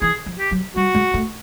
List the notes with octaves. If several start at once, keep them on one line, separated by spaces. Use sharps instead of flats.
E3 G#4
F3
G4
F#3
G3 F#4
G#3
A3